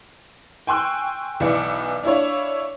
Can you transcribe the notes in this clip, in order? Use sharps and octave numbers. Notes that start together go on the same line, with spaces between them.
G5 G#5 C6 C#6 E6 F#6
B1 E3 E4 D5 D6 C#7
D4 E4 F4 C#5